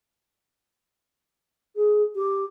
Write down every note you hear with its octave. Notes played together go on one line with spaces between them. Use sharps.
G#4
G4